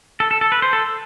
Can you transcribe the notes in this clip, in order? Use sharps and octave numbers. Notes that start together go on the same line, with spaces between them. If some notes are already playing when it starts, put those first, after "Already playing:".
A4
A4
A4
B4
C5
A4